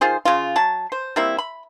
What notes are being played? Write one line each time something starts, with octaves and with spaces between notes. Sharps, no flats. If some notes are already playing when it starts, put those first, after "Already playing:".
D#3 F4 G#4 C5
C#3 F4
F#3 A5
C5
G3 A#3 C4 E4
B5